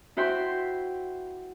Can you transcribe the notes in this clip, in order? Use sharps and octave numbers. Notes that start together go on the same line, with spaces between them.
E4 F#4 C5 E5 G5 C6